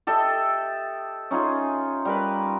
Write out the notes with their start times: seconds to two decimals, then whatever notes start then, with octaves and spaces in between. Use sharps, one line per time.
0.07 G4 A4 D#5 E5
1.31 C#4 D#4 F4 G#4
2.05 G3 A#4 B4